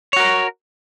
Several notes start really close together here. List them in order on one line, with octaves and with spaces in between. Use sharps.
C#5 F#4 A#4